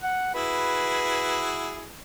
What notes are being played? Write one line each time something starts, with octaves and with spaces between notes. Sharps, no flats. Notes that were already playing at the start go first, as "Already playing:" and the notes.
F#5
E4 F#4 G#4 B4